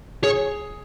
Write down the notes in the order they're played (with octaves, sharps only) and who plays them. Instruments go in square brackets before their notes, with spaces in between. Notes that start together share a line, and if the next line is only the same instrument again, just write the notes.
[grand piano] G#4 [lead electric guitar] C#5